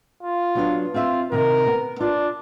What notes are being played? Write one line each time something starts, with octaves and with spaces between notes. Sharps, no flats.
F4
F#3 B3 D4
C4 F4 E5
C3 D#3 A#4
B3
D4 F4